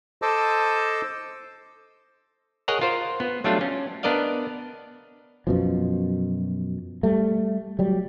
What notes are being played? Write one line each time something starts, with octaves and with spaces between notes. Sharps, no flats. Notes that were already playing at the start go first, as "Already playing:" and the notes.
A4 C5 D#5 A5 D6 E6
G#4 A#4 C#5 D#5 F#5 A#5
F4 A#4 C5
B3
F#3 G3 A3 D4 F4
C#4
B3 D4 A#4 D5 D#5 F5
F#2 B2 F3
G3 A3
F#3 G3